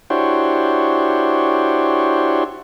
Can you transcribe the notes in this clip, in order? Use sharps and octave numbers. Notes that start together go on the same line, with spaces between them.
D4 E4 F#4 G4 C5 C#5